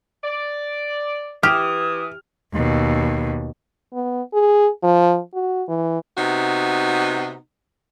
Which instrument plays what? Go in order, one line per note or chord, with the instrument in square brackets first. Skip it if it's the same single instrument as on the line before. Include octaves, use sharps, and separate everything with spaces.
[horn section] D5
[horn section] E3 [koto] G4 [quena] D#6 [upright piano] F6
[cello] D#2 B2
[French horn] B3
G#4
F3
F#4
E3
[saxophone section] C3 B3 D#4 F#4